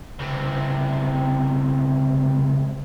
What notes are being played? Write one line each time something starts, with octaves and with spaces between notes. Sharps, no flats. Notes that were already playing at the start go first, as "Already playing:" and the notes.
C#2 C3